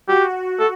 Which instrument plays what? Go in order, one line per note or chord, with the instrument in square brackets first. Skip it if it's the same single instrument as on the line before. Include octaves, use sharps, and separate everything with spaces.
[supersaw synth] F#4 [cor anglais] G4
[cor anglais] A4